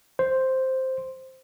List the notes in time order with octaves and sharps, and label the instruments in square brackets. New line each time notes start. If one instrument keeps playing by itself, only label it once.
[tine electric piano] C5